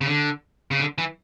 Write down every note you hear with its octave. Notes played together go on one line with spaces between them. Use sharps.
C#3
D3
C#3
D3
E3